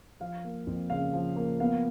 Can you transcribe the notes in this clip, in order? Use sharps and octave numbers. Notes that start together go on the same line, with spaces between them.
F3 F5
A#3
F2
C#3 F5
F3
A#3
B3 F5